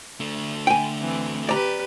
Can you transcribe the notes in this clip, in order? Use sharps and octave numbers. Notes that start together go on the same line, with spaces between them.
D3 A3
G5 G#5
E3 C4
G4 B4 D5 A#5